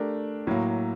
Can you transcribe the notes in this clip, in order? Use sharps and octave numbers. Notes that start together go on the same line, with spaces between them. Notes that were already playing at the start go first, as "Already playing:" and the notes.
Already playing: A3 D4 G4 A#4
A2 F#3 A#3